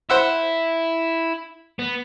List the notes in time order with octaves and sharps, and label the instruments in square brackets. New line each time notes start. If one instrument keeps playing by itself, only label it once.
[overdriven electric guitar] E4 [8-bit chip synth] C5 F#5 E6
[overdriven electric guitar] B3